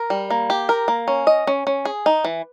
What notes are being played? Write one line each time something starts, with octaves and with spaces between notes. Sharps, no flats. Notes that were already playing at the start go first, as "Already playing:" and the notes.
Already playing: A#4
G3
A#3
G4
A#4
A#3
C#4
D#5
C#4
C#4
G#4
D#4
E3